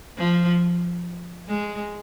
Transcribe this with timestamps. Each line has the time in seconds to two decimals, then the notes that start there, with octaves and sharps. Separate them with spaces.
0.18 F3
1.48 G#3